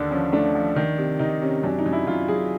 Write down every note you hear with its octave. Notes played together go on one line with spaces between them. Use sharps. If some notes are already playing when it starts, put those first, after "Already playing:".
Already playing: D#2 D3 D4
F3 C#4
A3 D4
F3
D#3
C3
D#3 D#4
C3 C#4
F#2 D4
D#4
F#2
E4
F#2 F4
F#2 G#4